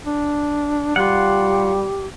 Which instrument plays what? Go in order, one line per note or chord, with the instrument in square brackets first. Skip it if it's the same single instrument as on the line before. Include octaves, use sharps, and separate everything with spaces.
[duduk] D4
[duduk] G3 [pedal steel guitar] F4 F#5 [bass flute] G4